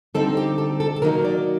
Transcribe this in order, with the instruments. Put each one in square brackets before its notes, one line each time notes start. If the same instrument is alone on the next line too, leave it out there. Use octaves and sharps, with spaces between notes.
[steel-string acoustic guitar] D3 G3 C4 D#4 A4
G4
A4
A4
A4
D#3 F#3 A#3 D#4 A#4
D5